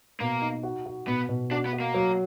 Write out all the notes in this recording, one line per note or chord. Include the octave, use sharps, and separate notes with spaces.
B2 A#3
D#4
F#4
F#4
B2 B3
B2
D4 F#4
B3
F#4
A#3
F#3